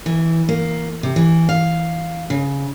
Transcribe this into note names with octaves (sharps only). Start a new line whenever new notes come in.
E3
A#3
C3
E3
F5
C#3